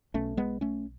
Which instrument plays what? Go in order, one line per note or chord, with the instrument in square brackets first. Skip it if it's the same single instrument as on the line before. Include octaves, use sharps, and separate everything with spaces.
[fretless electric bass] B1 B2 A3 C#4
G#3 B3
A3 C#4